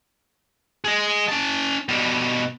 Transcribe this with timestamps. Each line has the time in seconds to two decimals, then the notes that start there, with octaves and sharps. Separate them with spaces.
0.85 G#4 D#5
1.29 C#4 A5
1.89 B2 G3